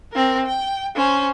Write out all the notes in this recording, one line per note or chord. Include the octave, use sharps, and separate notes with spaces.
C4 A#4
G5
C#4 C5